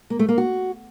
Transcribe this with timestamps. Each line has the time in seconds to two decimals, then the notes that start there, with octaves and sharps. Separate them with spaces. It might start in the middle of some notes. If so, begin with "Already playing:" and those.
0.10 A#3
0.19 A3
0.29 A#3
0.38 F#4